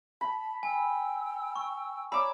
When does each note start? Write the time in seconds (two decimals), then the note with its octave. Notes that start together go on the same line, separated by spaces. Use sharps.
0.21 A5 B5
0.63 G5 G#5 E6
1.56 C#6
2.12 C#5 D5 A#5 B5 D6 E6